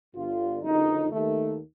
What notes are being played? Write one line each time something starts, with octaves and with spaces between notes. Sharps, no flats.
G1 G2 D3 F4
F#1 F2 D3 D#4
D#2 D#3 A3